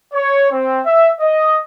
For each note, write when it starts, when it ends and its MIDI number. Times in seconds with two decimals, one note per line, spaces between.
0.14 0.48 73
0.51 0.79 60
0.85 1.09 76
1.20 1.58 75